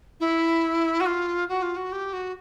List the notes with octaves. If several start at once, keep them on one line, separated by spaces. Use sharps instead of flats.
E4
F#4
F4
F#4
F4
F#4
G4
F#4